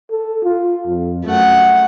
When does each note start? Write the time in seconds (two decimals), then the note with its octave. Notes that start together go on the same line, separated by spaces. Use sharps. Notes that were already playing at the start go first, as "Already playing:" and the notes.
0.11 A4
0.44 F4
0.87 F2
1.25 F#2 A3 F#5